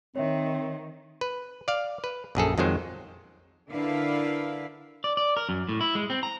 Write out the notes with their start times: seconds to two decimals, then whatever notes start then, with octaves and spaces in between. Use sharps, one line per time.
0.16 D#3 C4 C#5 E5
1.21 B4
1.68 D5 F5
2.04 B4
2.35 A#1 F#2 G#4 A4
2.58 F2 D#3 F#3 G#3 C5
3.70 D3 D4 E4 A#4 B4 F5
5.04 D5
5.17 D5
5.37 A#4
5.49 F#2
5.69 A2
5.81 E4
5.95 G#3
6.10 C4
6.23 A#5